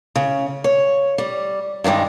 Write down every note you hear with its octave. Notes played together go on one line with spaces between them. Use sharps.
C#3
C#5
G3
G2 D#3 G3 G#3